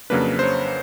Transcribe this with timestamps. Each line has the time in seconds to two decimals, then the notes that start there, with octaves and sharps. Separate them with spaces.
0.10 F2 C#3 F#3 A#3 D4 B4
0.39 C5
0.43 C#5